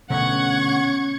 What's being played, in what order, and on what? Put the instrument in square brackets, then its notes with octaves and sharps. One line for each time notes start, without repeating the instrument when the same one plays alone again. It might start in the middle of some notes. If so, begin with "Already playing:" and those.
[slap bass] B2 D3 A3 [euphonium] C#4 [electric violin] F#5 [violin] C#6 G#6